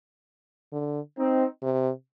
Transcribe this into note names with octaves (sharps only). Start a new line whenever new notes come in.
D3
C4 D#4
C3